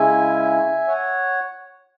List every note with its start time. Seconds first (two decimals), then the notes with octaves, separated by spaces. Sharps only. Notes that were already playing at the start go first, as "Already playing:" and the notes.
Already playing: C#3 G#3 C#4 E4 E5 G#5
0.88 C#5 F#5